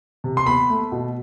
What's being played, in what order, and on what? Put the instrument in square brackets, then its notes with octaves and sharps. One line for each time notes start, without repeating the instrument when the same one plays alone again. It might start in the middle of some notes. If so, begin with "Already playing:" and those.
[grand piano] C3
C6
B3 B5
A3
B2